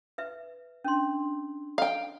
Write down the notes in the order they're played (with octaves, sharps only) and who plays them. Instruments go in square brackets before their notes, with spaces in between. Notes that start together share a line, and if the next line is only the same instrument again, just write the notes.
[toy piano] B4 E5
C#4 D4 C6
[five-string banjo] F5 G5